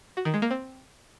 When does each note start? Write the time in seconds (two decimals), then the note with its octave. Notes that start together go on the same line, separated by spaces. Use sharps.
0.17 F#4
0.25 D#3
0.34 G#3
0.42 A#3
0.51 C4